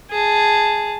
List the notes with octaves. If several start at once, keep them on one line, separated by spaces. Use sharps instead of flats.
G#4 A5